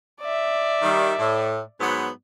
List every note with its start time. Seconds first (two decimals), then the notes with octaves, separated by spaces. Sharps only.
0.21 D5 E5
0.83 D#3 G3
1.19 A2
1.81 G#2 F#3 B3